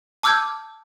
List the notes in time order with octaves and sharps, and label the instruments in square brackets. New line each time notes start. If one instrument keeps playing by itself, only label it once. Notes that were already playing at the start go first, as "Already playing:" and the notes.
[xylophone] A5 D6 E6 F6 G6 G#6